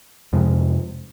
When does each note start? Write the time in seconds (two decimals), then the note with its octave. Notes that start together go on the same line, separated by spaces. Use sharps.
0.33 F2 C3 F3 G#3